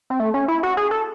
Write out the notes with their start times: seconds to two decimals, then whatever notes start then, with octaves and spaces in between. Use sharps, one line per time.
0.10 C4
0.20 A3
0.34 C#4
0.48 E4
0.63 F#4
0.77 G#4
0.91 A4